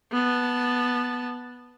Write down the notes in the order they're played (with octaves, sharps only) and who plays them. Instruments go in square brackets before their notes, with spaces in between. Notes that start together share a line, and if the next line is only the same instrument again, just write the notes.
[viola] B3 A5